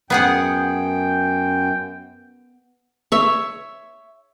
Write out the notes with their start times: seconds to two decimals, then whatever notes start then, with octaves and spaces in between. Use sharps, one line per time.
0.10 F#2 B3 G#4 F#5 G5
3.12 C#5 E5